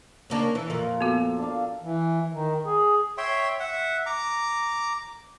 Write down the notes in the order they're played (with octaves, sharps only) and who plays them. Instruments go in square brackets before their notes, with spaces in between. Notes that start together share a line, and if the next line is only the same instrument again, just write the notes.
[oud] C#3 A#3 D4
E3
[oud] F2 A#2 [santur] A#3
[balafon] B3 F#4 [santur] A4
[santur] D4 F5
[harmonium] E3
D#3
G#4
[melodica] C#5 E5 G5 C6
E5 F#5
A#5 D6